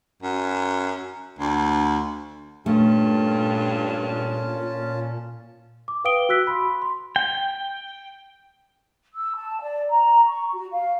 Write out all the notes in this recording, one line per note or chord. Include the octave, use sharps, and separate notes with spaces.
F#2
D2
G2 A#2 A3 C#4 F4 A5
D6
B4 F5 G5 D#6 D7 G7
F#4 E6 F#6 B6
B5 C6
C6
G5
E6
A5
D5
A#5
C#6
F#4
F5